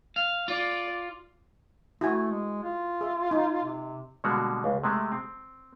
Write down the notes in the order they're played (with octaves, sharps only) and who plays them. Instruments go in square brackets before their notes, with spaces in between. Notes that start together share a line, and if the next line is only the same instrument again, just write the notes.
[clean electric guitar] F5
[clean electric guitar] F4 [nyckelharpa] D5
[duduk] A3 [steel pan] E4 F#4 G#5
[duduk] G#3
F4
[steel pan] G#4 E5
D#4
[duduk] C3
[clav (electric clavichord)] B2 D3 G3 G#3 A#3 F#4
C#2
C3 G#3 A3
C4